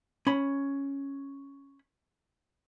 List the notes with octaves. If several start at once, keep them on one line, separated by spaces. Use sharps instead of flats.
C#4 B5